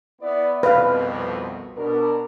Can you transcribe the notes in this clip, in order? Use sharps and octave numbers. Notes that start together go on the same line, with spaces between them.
B3 E4 D5
C2 F2 B2 B4 F5
B2 D4 A#4